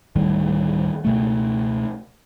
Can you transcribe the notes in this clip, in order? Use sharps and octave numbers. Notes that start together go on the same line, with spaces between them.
D2 A2 D#3 G3
C#2 B2 A3